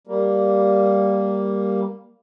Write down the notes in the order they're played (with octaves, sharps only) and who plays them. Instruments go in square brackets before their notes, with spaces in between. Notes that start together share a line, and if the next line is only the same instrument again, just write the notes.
[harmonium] G3 A#3